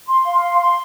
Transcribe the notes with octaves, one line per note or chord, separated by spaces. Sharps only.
C6
F5
C6
C6